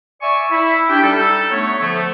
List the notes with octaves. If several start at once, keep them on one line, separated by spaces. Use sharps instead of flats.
D5 E5 G#5 C#6
E4 E5
D4 G4 G5
G3 D#4 A4
A3 B3 C#5
D3 F3 A3